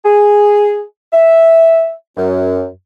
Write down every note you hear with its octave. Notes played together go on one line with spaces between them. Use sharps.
G#4
E5
F#2